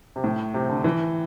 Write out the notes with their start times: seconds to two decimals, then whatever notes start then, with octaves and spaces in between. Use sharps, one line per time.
0.16 C3
0.24 A2
0.54 C3
0.69 D3
0.84 E3